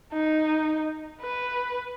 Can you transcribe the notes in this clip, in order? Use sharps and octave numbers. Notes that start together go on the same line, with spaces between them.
D#4
B4